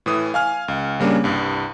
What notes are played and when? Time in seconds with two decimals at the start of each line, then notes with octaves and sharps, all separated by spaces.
0.06 A2 E3 D#6
0.34 F5 G#5 F6
0.68 C#2
1.00 C#3 G3 A#3 C#4 D4
1.24 C2 G2